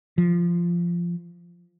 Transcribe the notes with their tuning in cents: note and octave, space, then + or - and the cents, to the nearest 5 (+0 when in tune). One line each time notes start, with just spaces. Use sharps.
F3 -15